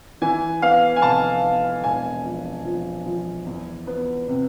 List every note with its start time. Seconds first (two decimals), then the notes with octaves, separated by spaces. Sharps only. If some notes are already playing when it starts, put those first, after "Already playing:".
0.22 E3 G#5
0.62 B3 F5
0.96 G#5
1.02 F1 A5
1.43 B3
1.84 E1 G#5
2.24 F3
2.65 F3
3.06 F3
3.46 E2
3.87 B3
4.28 C3